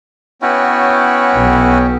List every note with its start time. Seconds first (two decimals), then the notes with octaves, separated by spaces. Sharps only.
0.42 B3 C#4 E4 F#4 C#5 G5
1.34 B1